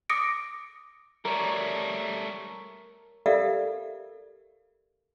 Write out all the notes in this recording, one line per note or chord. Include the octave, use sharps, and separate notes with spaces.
D6 D#6 A#6 C#7 D7
G3 A3 A#4 C#5
G4 A4 A#4 D5 E5 F5